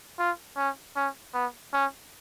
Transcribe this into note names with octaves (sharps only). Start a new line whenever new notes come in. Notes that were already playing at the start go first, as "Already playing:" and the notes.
F4
C#4
C#4
B3
C#4